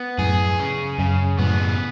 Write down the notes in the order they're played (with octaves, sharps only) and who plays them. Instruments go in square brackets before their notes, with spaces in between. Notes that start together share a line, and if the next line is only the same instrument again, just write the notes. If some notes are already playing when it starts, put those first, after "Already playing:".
Already playing: [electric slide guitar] B3
[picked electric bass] F#2 A2 [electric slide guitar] G#4
[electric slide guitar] C#3
[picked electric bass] F#2 [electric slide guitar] C#3
[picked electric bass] F#2 A2 [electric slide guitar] B3